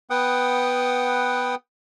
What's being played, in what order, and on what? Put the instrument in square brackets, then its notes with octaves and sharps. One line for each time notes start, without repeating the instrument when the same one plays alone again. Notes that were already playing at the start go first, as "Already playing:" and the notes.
[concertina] B3 B4 F#5 G5 D#6